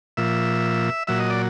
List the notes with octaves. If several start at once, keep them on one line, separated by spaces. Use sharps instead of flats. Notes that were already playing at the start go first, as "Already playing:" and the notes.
A#2 F3 E5
A#2 F#3 E5
D#5
D5